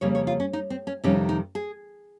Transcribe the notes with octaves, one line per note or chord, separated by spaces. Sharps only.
F2 C#3 G3 A#3 C#5
C#5
F4
C#4
D#4
C4
C#4
F2 C3 D#3 G3 C#4
D#4
G#4